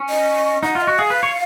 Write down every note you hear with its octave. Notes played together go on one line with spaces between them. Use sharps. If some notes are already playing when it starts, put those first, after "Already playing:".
Already playing: C#4
D#5
D#4 F#5
F4
D#5
F#4
G#4 F5
B4
C#5